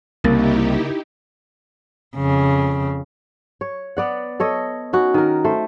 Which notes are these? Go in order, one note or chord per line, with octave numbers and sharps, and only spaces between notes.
C2 C#3 A#3 D#4 E4 G4 A#4 A6
F2 C#3
C#5
B3 D5 F#5
A4 C#5 D#5
C#4 D#4 F#4
D#3 A#4
A3 C5